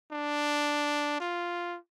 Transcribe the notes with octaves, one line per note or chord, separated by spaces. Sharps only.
D4
F4